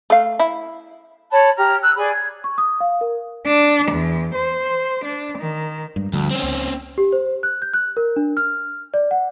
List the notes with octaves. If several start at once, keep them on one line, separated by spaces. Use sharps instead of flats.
A3 F5
E4
C#5 A5 B5
G4 A#5 F6
E6 F#6
G#4 D5 G#5 B5
G#6
C#6
D#6
F5
A#4
D4
E2
C5
D4
D#3
G2 G#3
D2 D3 F3 G3
C4 C#4
C#2
G4
C5
F#6
G6
F#6
A#4
D4
F6
D5
F#5